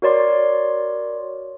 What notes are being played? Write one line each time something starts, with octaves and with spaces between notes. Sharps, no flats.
F#4 A#4 C#5 D5 C6